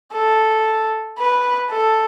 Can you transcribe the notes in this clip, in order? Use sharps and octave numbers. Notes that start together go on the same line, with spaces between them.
A4
B4
A4